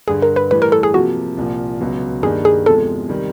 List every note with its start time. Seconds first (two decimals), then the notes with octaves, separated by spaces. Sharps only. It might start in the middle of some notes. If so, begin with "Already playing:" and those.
0.08 G2 D3 G3 G#4
0.22 A#4
0.36 B4
0.51 A2 E3 G3 B4
0.62 A#4
0.72 A4
0.83 G#4
0.94 C3 F3 A#3 F#4
1.37 C2 A#2 F3
1.81 C#2 B2 F#3
2.23 G2 D#3 G3 A#3 D4 G#4
2.45 G#4
2.66 E2 C3 F3 G#3 A4
3.09 C3 D#3 G3